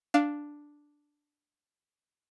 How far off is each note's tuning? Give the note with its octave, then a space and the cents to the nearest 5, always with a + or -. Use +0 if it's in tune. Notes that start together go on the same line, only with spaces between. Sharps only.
D4 +0 F5 +0